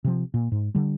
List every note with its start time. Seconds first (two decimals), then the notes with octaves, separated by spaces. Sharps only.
0.04 C3 F3
0.34 A#2
0.52 G#2
0.75 D3 G3